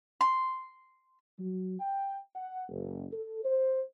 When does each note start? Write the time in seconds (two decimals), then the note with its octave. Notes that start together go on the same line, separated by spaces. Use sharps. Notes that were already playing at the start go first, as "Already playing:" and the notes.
0.21 C6
1.39 F#3
1.79 G5
2.34 F#5
2.69 F#1
3.12 A4
3.44 C5